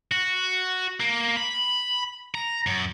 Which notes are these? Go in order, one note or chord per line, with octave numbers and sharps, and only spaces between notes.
F#4
A#3
B5
A#5
F#2